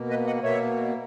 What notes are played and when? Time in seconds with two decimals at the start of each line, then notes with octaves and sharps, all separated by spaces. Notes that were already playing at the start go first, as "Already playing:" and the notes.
Already playing: B2 A#3
0.10 B4 D#5
0.26 D#5 F#5
0.43 B2 A#3 C#5 E5